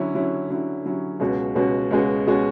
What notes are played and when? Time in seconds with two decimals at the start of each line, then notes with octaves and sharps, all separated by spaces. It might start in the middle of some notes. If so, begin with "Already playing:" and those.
Already playing: D3 F#3 C#4 E4
0.15 D3 F#3 C#4 E4
0.50 D3 F#3 C#4 E4
0.86 D3 F#3 C#4 E4
1.20 C#2 B2 G#3 C#4 F#4
1.55 C#2 B2 G#3 C#4 F#4
1.91 C#2 B2 G#3 C#4 F#4
2.27 B2 G#3 C#4 F#4